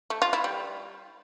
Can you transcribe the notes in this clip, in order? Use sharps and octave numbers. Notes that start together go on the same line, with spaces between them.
A3
F4
E4
G3